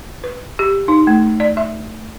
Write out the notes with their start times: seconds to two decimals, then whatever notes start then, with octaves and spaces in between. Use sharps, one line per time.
0.24 B4
0.59 G4
0.88 D#4
1.07 A3
1.40 D5
1.57 E5